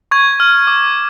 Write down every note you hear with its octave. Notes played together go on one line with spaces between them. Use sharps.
C#6 G#6
F6
D6